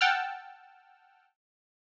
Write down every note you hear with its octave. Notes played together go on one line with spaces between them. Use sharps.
F#5 G5 A5 E6 F6